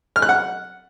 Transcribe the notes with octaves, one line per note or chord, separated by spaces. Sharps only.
F6
F#6
F#5